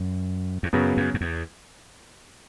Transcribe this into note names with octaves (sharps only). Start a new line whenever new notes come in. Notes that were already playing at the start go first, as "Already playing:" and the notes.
Already playing: F#2
E2
F#2 C#3 F#3 B3
F#2
F#2
E2